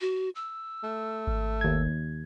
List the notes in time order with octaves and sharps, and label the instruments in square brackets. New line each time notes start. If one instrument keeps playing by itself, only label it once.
[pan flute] F#4
E6
[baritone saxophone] A3
[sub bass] G#1
[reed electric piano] D#2 G#6